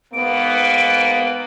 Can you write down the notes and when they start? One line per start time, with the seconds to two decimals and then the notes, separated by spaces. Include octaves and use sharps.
0.13 G#2 A#3 B3 D7